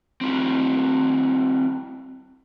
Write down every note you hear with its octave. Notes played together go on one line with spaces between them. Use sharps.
C4 E4 F#4